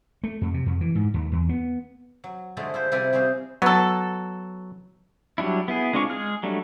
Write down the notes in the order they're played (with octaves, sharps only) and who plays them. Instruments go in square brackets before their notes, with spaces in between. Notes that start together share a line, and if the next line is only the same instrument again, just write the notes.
[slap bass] A3
F2
C3
F2
E3
G#2
D#2
E2
B3
[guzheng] F#3
D3 F3 G#3 A3 E4
E4 F4 C5
C3 F3 G3 E4 D5 G#5
G3 C4 C#4 G#4 C5 F5
[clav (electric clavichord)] F#3 [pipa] B3 A4
[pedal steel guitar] F#3 G3 D4 E4
B3 E4 G#4
G#3 C4 D4 F4 C#6
G#3 G#4 F6
F#3 G3 A3 D4